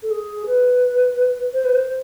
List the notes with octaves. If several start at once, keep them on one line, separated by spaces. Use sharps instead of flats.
A4
G#4
B4
C5
B4
C5